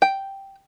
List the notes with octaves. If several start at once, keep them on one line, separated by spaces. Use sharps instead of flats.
G5